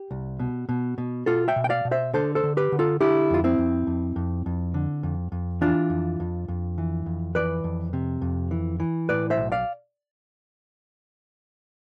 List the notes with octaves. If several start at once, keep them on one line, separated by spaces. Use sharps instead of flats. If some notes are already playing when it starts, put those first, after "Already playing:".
Already playing: G4
C2
B2
B2
B2
B2 F4 A4
E5 G5
B2
G5
D5 F5
B2
C5 E5
D3 A4 C5
A4 C5
D3
G4 B4
D3
F4 A4
D3 E4 G4
F2 F4
C4 E4
F2
F2
F2
F2
D3
F2
F2
E3 D4 F4
F2
F2
F2
E3
F2
E3 B4 D5
F2
C3
F2
E3
E3
A2 B4 D5
C5 E5
B1
D5 F5